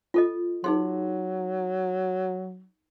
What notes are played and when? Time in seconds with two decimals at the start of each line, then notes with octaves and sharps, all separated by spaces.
0.14 F4 A4 D#5
0.64 F#3 D#4 G#4 C6